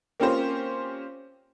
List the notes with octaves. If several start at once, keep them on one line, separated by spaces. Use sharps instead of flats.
A#3 C4 C#4 F4 G4 C5